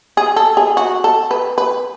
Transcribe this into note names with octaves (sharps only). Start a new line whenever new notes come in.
G#4
A4
G#4
F#4
A4
B4
B4